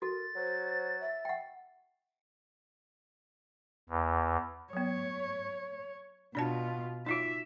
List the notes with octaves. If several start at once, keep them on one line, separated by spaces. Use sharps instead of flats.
F#4 A4 A#4 A6
F#3 C5
E5
F#5 G5
E2
F#3 B3 C#5
B2 D4 F4 D5 A5
D#4 F4 F#4 E5